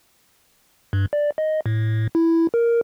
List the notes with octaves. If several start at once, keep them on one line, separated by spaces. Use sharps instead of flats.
G2
D5
D#5
A2
E4
A#4